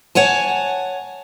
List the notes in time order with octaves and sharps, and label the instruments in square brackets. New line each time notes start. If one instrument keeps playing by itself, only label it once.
[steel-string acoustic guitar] C#5 F#5 G#5 A5